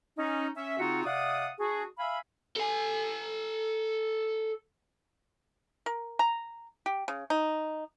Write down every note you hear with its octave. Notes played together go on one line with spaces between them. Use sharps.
C#4 D#4
C#4 E5
C#3 C4 D#4 F4 F#4
C3 D5 F5 F#5 D#6
D4 F#4 G#4
E5 F5 G#5 B5
A4 G#5
A#4
A#5
G4
C#3
D#4